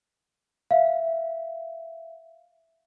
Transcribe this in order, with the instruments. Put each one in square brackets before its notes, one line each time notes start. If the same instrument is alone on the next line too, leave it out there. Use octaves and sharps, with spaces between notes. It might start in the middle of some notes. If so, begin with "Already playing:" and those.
[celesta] E5 F5